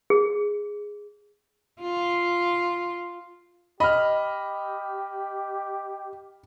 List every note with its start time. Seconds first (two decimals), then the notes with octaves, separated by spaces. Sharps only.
0.10 G#4
1.81 F4
3.80 G4 D#5 B5 F6